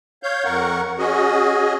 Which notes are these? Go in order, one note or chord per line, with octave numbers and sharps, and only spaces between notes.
C#5 F5 G6
F2 A#4 F#5 C#6
C#4 F#4 G#4 D#5